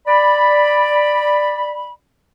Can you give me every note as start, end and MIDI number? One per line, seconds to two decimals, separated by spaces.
0.07 1.91 74
0.07 1.91 83